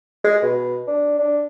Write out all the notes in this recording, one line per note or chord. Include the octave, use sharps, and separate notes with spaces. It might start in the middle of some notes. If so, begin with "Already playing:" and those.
G#3
B2
D4
D4